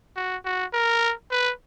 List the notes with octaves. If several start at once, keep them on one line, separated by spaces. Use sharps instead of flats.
F#4
F#4
A#4
B4